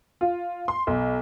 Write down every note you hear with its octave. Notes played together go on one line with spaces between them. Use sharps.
F4
C6
B1